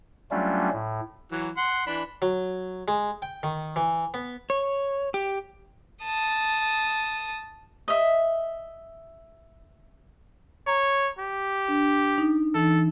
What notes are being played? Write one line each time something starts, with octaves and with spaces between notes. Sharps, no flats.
F#3 G3 A3 C#4 D4 F4
A2
E3 F#3
F#5 C6
E3 D4 B5
F#3
G#3
G5
D#3
E3
B3
C#5
G4
A5 D#6
D#5 E5
C#5 A#5
G4
D4
D#4
E3 D#4 A4